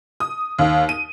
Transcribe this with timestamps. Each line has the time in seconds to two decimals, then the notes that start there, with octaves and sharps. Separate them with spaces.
0.20 D#6
0.59 D#2
0.89 D#7